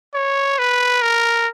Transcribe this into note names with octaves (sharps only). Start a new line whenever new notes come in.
C#5
B4
A#4